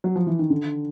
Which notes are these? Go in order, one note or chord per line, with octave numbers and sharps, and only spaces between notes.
F#3
F3
E3
D#3
D3